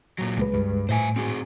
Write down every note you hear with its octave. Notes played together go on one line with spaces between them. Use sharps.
A#2 F#3
C#2 G#3 B4
G2
A2 C5 E5 G#5
C4 F#4 G#4